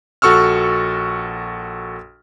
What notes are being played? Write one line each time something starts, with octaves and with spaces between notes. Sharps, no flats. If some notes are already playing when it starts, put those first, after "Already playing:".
A#1 F#4 A4 C#6 E6 F6